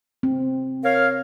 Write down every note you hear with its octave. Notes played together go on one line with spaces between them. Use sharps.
C4
A#4 C#5 F5